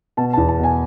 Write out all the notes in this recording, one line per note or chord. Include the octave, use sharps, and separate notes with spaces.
B2 A5
A5
E2
A5
B2 G#5